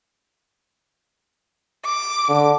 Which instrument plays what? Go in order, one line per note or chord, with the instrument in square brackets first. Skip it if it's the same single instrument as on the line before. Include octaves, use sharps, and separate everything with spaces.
[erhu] D6
[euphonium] D3